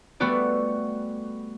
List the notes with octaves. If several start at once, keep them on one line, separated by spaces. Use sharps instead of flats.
G3 A3 B3 F#4 A4 D5